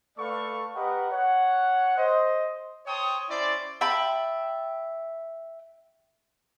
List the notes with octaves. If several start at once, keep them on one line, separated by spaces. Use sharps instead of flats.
A3 A4 B4 D5 F5 C#6
G4 A#4 B4 D#5 F#5
C#5 F#5
C5 D#5
C5 C#5 G5 A5 C#6 D#6
C#4 E4 C5 D5
E5 G5 A5 B5